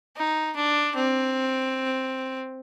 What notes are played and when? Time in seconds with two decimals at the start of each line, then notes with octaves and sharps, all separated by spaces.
0.17 D#4
0.56 D4
0.96 C4